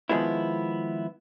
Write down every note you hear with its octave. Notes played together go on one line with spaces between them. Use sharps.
D#3 F3 G#3 B3 E4